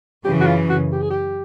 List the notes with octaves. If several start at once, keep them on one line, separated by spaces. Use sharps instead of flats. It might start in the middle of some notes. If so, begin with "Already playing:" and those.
F#2 C#3 E3 G4
F#4
F4
F#4
G4
G#4
G4